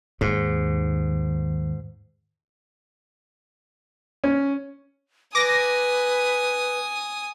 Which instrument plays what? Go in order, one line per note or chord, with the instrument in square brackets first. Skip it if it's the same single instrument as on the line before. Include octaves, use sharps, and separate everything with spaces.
[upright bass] D#2 [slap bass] G#2
[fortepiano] C#4
[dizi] B4 [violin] G#5 D#6 [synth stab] D6 A#6